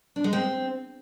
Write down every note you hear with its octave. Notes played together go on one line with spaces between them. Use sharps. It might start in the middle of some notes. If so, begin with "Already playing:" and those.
D4
G#3
C4